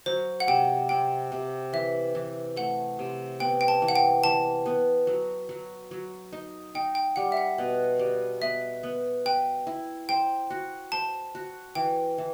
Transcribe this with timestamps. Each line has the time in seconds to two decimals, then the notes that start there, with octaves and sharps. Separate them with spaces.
0.06 F#3 C5
0.40 F#5
0.47 C3 G5
0.89 C3 G5
1.32 C3
1.73 E3 E5
2.15 E3
2.56 A3 F#5
2.99 C3
3.40 B3 G5
3.61 G5
3.68 A5
3.82 E3
3.88 F#5
3.96 G5
4.24 E3 A5
4.66 B3
5.07 F#3
5.49 F#3
5.91 F#3
6.33 D#4
6.75 D#4 G5
6.95 G5
7.16 G3 F#5
7.32 E5
7.37 F#5
7.58 B2
7.99 G3
8.42 B3 E5
8.83 B3
9.25 B4 G5
9.67 E4
10.09 C5 G5
10.50 F#4
10.92 C5 A5
11.35 F#4
11.75 E3 G5
12.18 E3